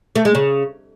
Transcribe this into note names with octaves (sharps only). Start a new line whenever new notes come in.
A3
G#3
C#3